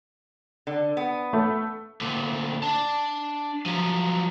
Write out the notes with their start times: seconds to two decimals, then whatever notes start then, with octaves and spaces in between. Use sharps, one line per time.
0.67 D3
0.97 B3
1.33 A3
2.01 D2 A#2
2.63 D4 A5
3.66 F3 F#3